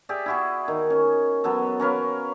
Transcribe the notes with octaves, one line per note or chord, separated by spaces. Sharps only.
G4 G#4 D5 E5
E4 F#4 G#4
D#3
C#4
F#3 B3 A4
C#4 A#4 B4 F5